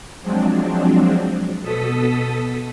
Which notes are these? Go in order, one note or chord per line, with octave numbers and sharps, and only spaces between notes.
F3 F#3 G#3 C4 D4
B2 A4 D#6 B6